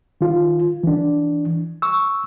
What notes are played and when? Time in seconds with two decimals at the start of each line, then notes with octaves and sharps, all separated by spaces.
0.21 D#3 F4
0.83 E3 D4
1.82 C#6 E6